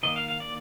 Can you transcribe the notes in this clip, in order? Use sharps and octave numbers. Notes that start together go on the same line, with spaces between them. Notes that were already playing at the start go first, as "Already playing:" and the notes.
D#3 A#3 D#5
F5
F5
D5